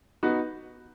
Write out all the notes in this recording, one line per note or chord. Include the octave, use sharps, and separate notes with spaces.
B3 D#4 F#4 B4